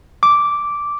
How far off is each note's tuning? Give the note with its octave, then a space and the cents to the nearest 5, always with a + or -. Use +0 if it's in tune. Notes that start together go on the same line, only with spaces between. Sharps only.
D6 -5